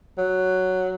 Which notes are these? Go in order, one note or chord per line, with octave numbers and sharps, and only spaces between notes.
F#3